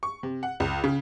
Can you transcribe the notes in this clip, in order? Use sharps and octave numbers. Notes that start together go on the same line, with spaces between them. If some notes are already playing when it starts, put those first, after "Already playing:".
C#6
C3
F#5
C#2
C#3